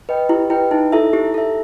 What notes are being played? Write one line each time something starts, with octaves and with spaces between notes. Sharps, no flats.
B4 D#5 G5
E4 G4
E4 B4 D#5 G5
D#4 E4
E4 A4 E5
E4 G4
A4 E5